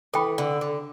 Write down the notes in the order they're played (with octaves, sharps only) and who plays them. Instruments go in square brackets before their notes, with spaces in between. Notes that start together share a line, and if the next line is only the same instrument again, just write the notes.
[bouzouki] E3 [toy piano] A4 G5 B5
[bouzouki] D3
D3